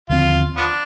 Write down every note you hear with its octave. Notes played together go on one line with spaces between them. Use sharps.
D#2 D3 F3 C4 F4
F3 B3 D4